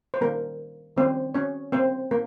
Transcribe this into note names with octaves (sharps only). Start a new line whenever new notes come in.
C5
D#3 G3 A#3 C#4 A#4
D#3 G3 A#3 C4 C#4 C5
C#4 C#5
C#3 G3 A#3 C4 C#4 C5
A#3 A#4